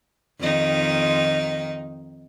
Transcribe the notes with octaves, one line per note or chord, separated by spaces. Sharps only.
F2 D#3 D#4